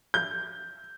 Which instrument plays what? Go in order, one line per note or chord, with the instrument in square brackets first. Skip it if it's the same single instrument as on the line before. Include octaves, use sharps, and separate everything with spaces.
[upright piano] G6